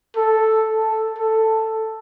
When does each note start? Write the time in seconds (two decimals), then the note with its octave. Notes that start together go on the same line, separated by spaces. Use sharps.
0.17 A4
0.84 A4
1.18 A4